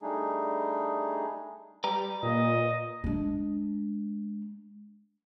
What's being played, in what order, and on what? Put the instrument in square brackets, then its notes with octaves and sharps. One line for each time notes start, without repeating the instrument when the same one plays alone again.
[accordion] G3 A3 D4 D#4 G#4
[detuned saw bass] G3 [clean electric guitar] B4 A#5
[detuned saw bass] A#2 [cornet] D#5
[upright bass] G#3 D4